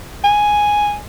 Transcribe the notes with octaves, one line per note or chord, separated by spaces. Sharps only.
G#5